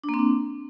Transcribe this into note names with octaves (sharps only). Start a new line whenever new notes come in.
D4
A#3
C4
D4